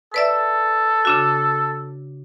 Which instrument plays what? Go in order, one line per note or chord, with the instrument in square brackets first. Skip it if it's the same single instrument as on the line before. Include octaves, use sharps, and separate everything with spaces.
[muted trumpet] A4 [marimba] B4 D5 E5
[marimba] C#3 D4 F#4